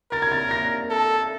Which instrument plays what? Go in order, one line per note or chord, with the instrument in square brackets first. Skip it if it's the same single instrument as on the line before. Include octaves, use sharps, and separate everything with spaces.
[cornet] A#4 [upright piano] A6
[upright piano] G#6
A6
A#6
[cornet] A4